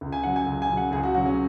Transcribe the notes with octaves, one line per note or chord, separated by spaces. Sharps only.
C#2
G#5
C#3 F#3 F#5
G#5
C#2
G#5
C#3 F#3
F#5
C#2 G#4
F#4
C#3 F#3 F#4
C#4